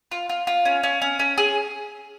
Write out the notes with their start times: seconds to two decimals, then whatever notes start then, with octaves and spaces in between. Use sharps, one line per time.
0.11 F4
0.29 F4
0.47 F4
0.65 C#4
0.83 C#4
1.02 C#4
1.19 C#4
1.38 G#4